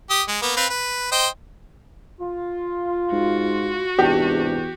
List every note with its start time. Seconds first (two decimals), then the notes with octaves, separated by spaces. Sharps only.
0.10 G4 D#6
0.28 G#3
0.42 A#3 B3
0.57 C4 B4 F5
0.70 B4
1.12 C5 D#5 G5
2.19 F4
3.12 G#2 F#4
3.99 E2 G#2 C3 D4 G4